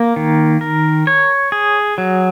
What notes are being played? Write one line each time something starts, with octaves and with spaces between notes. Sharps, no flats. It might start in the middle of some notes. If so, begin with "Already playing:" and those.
Already playing: A#3
D#3
A#4
C#5
G#4
F#3